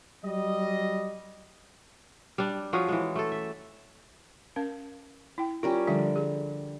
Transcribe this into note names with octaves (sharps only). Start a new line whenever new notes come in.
F#3 G3 D#5
G3 D4
F3 C#4 F#4 G#4
E3 G#3
A3 A4
E5
C#4 A#4 F5
E4 G5
G3 C#4 F4 A#4
D3 F3 G3 E5
G#4